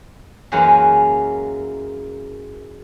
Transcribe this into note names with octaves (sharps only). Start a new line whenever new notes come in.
F#2 E3 F#3 G#3 A#3 C#4